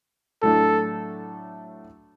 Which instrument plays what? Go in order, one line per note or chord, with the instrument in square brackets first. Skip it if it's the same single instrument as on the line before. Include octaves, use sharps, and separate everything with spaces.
[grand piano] A2 F#3 A3 D4 [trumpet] A4